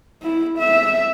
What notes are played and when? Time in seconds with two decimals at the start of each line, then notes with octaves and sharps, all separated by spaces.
0.22 E4
0.59 E5